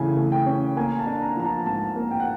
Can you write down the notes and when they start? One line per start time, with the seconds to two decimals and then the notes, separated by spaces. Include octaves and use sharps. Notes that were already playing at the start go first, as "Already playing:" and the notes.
Already playing: C#3 E3 A3 G#5
0.17 A3
0.32 G5
0.46 C#4
0.77 A#3 G#5
0.99 A5
1.07 D4
1.22 A#5
1.36 F3 A#5
1.44 A5
1.66 G#2 A5
1.96 A#3
2.11 G5
2.20 F#5